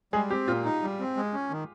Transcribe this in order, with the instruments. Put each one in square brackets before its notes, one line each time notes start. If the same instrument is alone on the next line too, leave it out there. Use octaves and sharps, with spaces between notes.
[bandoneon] G3 [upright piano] G#3 G#4
[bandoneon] C4 [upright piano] G4
[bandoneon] A#2 [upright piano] F4
[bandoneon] D#4
G3
C4
G#3
C#4
D#3